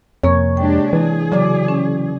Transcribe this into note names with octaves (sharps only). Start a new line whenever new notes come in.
F2 C3 A#3 A#4 C#5
G#3 D4 G4 G5
E3 G#4
C#3 F#3 D5
C#4